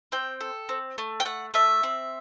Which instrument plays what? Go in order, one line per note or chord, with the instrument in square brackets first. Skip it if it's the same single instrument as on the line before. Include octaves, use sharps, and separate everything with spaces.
[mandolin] C4 G5
A4
C4
A3
G5
A3 F#5
A3 E5
C4